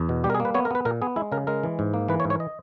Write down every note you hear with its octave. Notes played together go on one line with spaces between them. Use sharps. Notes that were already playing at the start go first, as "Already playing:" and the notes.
Already playing: E2
B2
G3 G4
A#4
G#4
A#3
B4
B3 C#5
A#4
B3 B4
A#2 A#4
B3 G#4
G#3 E4
C#3 A#4
G#3 A#4
E3
G#2
A#3
E3 B4
C#5
G#2
C#5
D#5